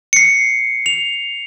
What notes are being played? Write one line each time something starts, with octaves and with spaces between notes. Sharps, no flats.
C7 C#7
F7